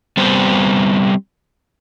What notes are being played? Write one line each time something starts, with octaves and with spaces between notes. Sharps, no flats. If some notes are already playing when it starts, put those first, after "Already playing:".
G3 B3 C4 C5